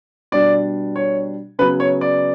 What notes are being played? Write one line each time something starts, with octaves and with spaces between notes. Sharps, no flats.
B2 G3 D4 D5
C#5
C#3 F#3 B3 B4
C#5
D5